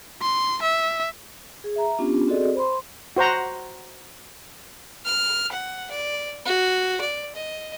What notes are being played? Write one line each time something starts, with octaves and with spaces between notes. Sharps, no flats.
C6
E5
G#4
E5 A#5
B3 C#4 D4 F4 G4
C4 F#4 G#4 A4 D5 D#5
C5 B5 C6
F#4 C5 F#5 A#5
F6
F#5
D5
F#4
D5
D#5